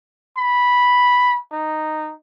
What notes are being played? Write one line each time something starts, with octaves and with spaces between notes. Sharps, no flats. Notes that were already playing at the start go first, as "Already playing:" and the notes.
B5
D#4